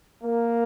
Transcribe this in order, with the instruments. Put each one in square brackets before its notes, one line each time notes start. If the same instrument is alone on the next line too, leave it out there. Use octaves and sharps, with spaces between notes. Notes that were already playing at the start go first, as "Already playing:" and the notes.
[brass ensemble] A#3